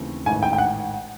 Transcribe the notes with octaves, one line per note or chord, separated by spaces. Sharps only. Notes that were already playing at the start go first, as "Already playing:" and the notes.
Already playing: D#2 C#3 E3 A3 C4
A1 G#2 D#3 G#5
G5
G5
F#5